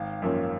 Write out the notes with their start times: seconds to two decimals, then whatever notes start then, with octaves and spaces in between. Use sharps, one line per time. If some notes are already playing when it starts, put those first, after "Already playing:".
Already playing: G#1 F5
0.22 F#2 F3 A#3 C#4